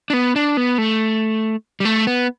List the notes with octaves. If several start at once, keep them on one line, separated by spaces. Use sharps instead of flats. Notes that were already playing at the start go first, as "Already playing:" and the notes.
D4
B3
D4
B3
A3
G3
A3
B3